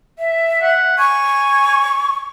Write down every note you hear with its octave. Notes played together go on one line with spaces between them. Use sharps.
E5
F#5
G#5 C#6